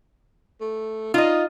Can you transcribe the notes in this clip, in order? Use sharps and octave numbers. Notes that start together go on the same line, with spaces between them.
A3
D#4 F4 D#5